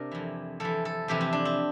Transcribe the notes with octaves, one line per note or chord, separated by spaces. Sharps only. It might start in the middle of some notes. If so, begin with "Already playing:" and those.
Already playing: C3 D4 A#4
F2 E3
F2 E3 A4
A4
F2 C3 E3 G4
C4
D4
C4